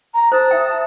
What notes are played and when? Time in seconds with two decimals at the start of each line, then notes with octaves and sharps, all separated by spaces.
0.14 A#5
0.32 C5 A5 D#6
0.51 E5 G5